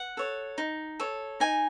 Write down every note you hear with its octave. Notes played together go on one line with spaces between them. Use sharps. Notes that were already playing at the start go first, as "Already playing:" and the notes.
Already playing: F#5
A4 C#5
D#4
A4 C#5
D#4 G#5